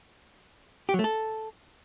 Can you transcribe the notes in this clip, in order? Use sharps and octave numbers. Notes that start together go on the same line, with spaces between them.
G4
F#3
A3
A4